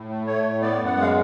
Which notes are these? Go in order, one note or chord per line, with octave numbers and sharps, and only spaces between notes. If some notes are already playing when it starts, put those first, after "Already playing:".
Already playing: A2
A3
A3 C#5
A2
B3 D5
F#2
F#5
G#3
F5